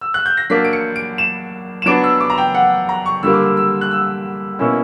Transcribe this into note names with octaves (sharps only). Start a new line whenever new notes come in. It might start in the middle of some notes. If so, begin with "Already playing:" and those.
E6
F#6
G6
A#6
F#3 A#3 D4 B6
D7
C#7
D7
E7
E7
F#3 B3 D4 D7
E6
D6
A#5
G5
F#5
A#5
C#6
D3 G3 A#3 E6
D6
E6
E6
F#6
E6
B2 A#3 C#4 E4 E6